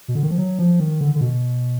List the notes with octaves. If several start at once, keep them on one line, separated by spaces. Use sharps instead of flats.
B2
D3
D#3
F3
F#3
F3
D#3
D3
D3
B2